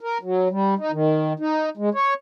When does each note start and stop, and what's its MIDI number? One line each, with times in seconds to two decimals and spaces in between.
0.01 0.18 70
0.22 0.48 54
0.51 0.74 55
0.78 0.91 63
0.92 1.33 51
1.40 1.70 63
1.77 1.90 56
1.94 2.14 73